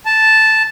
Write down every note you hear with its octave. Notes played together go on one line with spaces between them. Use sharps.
A5